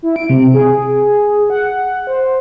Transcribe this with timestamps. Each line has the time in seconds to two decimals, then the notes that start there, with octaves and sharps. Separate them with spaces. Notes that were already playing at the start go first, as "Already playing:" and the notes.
0.02 E4
0.16 D7
0.29 C3
0.54 G#4
1.50 F#5
2.07 C5